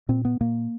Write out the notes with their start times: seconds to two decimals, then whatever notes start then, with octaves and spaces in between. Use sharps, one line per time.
0.09 A#2 C4
0.25 B3
0.40 A#2 A#3